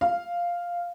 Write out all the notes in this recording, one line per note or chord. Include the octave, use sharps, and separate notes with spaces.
F5